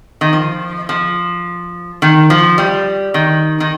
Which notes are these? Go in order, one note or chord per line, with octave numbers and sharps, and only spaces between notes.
D#3
F3
F3
D#3
F3
G3
D#3
D#3